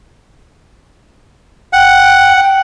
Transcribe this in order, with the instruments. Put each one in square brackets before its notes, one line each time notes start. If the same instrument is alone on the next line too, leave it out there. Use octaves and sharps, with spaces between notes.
[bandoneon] F#5 [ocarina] G5